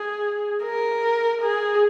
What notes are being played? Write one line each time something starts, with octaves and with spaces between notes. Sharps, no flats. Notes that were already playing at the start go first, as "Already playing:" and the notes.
Already playing: G#4
A#4
G#4